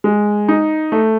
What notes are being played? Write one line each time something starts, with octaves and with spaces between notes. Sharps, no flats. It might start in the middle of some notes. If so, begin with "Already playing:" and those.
G#3
D#4
A3